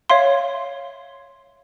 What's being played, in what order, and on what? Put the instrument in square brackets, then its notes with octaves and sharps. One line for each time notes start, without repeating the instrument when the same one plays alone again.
[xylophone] C#5 E5 F5 C6